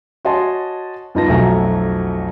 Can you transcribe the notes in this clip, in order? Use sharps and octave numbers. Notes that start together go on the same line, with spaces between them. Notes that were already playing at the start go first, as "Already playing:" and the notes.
F#4 C#5 D#5 G#5 A5 C6
G2 B3 D#4 F4 A5 A#6
B1 F2 A3 F#4 G#5 A#5